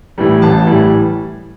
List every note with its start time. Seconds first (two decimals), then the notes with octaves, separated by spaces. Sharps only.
0.18 A2 E3 G3
0.42 A1 A5
0.67 A2 E3 G3